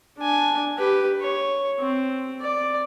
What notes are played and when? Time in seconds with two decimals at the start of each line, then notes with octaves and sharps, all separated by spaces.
0.18 D4 G#5
0.78 G4 B4
1.21 C#5
1.79 C4
2.41 D5